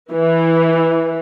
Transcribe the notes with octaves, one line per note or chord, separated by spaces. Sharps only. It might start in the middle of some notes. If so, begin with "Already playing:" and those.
E3